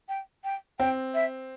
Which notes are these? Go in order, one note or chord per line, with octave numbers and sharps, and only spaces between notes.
G5
G5
C4 G5
E5